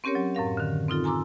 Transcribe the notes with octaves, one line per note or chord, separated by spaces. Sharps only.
C4 C#4 G4 A#4 C#5
F#3
F#2 A2 A#4 F5
D3 D#3
C4 D#4 F4 A4
G#5 A#5 C6 D6 E6